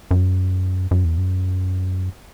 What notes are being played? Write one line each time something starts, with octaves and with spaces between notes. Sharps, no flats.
F#2
F#2
E2
F#2